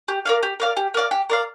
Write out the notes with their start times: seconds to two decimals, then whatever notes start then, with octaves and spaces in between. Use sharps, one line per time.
0.08 G4
0.25 A#4 D5 F5
0.43 G4
0.60 A#4 D5 F5
0.77 G4
0.94 A#4 D5 F5
1.11 G4
1.30 A#4 D5 F5